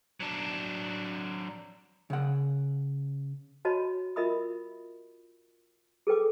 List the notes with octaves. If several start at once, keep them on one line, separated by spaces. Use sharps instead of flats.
F#3 D4
C#3 F#5
F#4 C#5 D#5 A5 B5
F4 A#4 D#5 E5 B5 D#6
G#4 A4 B4 G5 D6